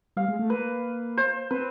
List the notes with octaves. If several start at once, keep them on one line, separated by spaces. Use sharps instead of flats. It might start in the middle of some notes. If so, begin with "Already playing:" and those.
G3 F5
G#3
A3
A#3 B4
C5
C4 B4